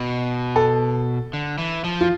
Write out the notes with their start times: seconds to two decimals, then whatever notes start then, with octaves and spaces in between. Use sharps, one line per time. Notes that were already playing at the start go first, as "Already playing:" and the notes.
Already playing: B2
0.56 A4
1.33 D3
1.58 E3
1.84 F3
2.01 F4